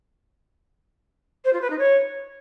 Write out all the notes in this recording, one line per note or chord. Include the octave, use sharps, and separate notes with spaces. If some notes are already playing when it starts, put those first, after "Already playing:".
C5
F4
B4
D#4
C#5